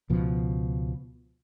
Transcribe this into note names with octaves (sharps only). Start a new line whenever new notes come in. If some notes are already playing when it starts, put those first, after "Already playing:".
C#2 B2 F3